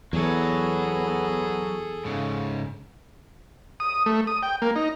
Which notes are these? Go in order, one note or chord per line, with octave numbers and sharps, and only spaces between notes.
E2 F#3 B3 G#4 A4
G#2 C#3
D#6
A3
D#6
G5
A#3
D#4